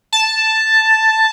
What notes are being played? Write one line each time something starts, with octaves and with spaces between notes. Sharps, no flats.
A5